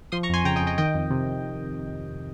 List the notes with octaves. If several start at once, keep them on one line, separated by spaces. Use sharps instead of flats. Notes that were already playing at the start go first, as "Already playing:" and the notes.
F3 C6 D#6
A#5 C#6
F2 G#5 C6
C#3 G5 A#5
D#5 G5
F2
D#5 G5
D#3 D#5 G5
F2
C3